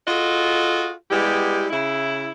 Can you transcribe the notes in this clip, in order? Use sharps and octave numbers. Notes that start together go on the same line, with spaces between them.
F4 F#4 G#4 A4 D#5
G3 G#3 B3 E4 G4
C#3 E4